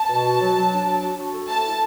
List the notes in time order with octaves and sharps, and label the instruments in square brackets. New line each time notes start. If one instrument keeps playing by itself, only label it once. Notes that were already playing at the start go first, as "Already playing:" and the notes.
Already playing: [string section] A5
[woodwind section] B2
F#4
F#3
F#3
D4
F#3
F#4
F#4
A4
[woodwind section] A3 [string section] A5
[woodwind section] E4